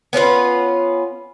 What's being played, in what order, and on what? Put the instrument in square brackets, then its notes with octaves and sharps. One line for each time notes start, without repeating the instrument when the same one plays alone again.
[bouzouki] B3 C#4 F4 B4